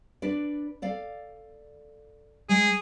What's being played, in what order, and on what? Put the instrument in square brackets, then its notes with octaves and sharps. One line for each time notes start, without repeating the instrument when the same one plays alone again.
[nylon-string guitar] D4 B4 D5
A4 D5 F5
[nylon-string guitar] G#3 [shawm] G#4